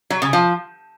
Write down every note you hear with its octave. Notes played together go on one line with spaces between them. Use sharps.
F#3
C#3
F3